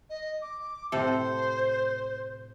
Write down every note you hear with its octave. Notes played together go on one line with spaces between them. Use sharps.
D#5
D6
A2 C3 A4 C5